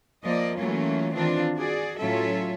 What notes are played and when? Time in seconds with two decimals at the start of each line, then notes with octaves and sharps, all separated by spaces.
0.24 F3 A#3 D5 D#5
0.55 E3 F#3 A3 A#3 C#4 F4
1.13 D#3 E3 C4 D4 F4
1.55 F#4 G#4 D5
1.98 A2 F#3 C#4 F4 A4 E5